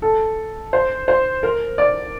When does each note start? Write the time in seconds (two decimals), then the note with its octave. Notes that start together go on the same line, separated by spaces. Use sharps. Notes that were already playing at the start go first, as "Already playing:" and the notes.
0.02 A4
0.73 C5
1.08 C5
1.43 A#4
1.78 D5